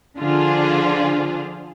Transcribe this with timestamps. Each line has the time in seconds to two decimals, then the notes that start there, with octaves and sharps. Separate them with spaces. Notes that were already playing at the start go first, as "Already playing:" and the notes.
0.18 D3 F3 D4 F4 G#4 C5